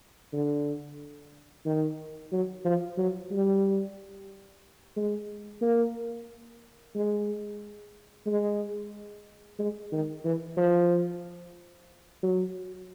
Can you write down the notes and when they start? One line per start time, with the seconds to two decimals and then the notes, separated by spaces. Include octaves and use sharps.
0.33 D3
1.66 D#3
2.32 F#3
2.65 F3
2.98 F#3
3.32 G3
4.97 G#3
5.62 A#3
6.95 G#3
8.27 G#3
9.59 G#3
9.92 D#3
10.25 E3
10.57 F3
12.23 F#3